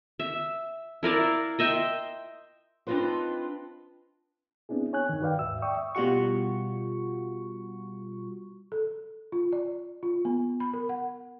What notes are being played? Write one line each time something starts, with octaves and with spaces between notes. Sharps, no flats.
E5
E4 A#4 D5 F5
D#5 E5 G5 C6
C4 D4 D#4 F4 B4 C5
B3 C4 D4 E4 G#4
C#5 G#5 F#6
G2 D#3
F#4 B4 D5 F5 G5
D#2 G#2 E5 E6
D5 E5 G5 C#6 D#6 E6
B2 G3 F4 F#4 C#6
A4
F4
D5
F4
B3
B5
A#4
F#5